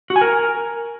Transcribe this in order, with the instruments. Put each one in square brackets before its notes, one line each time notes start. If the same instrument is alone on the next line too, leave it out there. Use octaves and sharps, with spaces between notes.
[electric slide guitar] F#4
G#5
A#4